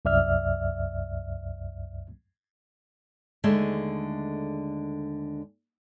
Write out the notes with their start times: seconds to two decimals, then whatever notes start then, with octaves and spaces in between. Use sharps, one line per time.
0.05 C2 F#2 D5 E5 F6
3.44 D#2 D3 G#3 A3 G#4 E5